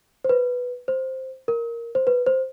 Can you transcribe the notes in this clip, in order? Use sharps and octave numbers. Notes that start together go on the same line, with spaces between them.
C5
B4
C5
A#4
C5
B4
C5